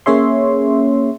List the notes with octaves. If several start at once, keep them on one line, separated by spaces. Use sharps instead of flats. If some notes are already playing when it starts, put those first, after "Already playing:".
A#3 C#4 G#4 C#5 E5 C6